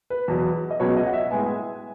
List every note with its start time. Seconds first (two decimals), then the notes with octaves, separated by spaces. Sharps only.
0.10 B4
0.28 E2 B2 F#3
0.71 D#5
0.80 C#2 B2 F#3 B3 C#5
0.97 D#5
1.07 F#5
1.13 E5
1.31 A2 G#3 B3 G#5